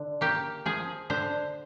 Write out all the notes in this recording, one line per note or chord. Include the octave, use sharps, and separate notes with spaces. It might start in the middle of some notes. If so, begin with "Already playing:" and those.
Already playing: D3
A#3 G4
F3 G#4
D3 C5